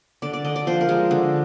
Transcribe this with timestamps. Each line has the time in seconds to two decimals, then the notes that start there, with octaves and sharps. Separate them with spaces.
0.22 D3 D5
0.33 D5
0.44 D3 D#5
0.56 D5
0.67 F3 C5
0.81 A#4
0.89 G#3 G#4
1.11 D3